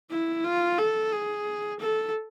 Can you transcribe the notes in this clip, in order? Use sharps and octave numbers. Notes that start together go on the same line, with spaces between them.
E4
F4
A4
G#4
A4